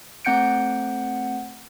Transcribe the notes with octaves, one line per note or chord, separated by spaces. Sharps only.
A3 C4 F#5 G6 C#7 D7